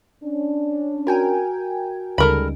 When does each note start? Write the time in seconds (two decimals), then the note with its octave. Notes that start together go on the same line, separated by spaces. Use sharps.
0.23 C#4 D4
1.07 F#4 A#4 G5 G#5
2.18 D2 C#3 G3 G#3 D#4 A4 A#4 B5